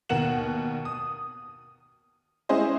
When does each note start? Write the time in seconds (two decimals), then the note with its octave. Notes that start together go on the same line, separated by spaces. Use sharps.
0.09 D#2 B2 A#4 F#5 E7 F#7
0.85 D#6
2.49 G#3 C#4 E4 G#4 C5 D#5